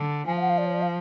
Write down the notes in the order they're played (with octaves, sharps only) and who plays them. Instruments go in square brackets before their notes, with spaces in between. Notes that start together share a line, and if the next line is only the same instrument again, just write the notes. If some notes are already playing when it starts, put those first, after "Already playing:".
Already playing: [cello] D3
[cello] F3 [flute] G#5
[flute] F5
F#5
F5
D5
C#5
D5
F5